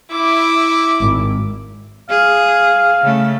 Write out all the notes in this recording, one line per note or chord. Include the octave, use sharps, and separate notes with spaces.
E4 D6
G#1
G#4 F5
C#3 A3